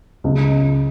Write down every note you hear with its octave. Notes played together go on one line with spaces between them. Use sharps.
C#2